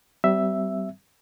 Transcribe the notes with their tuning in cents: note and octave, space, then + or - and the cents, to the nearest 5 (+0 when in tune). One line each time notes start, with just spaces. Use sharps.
G3 -30 C4 -35 E5 +0